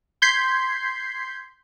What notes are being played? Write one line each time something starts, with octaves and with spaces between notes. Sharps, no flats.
C6 G6 G#6 B6 C7